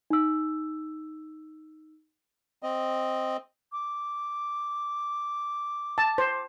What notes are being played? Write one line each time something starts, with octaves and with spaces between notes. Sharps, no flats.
D#4 E6
C4 D#5
D6
A5
C5